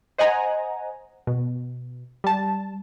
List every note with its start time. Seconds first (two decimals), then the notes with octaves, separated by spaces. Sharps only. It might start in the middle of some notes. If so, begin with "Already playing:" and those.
0.18 C5 D#5 F#5 G#5 A#5
1.27 B2
2.24 G3 A5